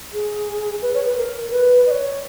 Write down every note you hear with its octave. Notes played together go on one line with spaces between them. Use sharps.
G#4
B4
C#5
B4
A#4
B4
D#5
C#5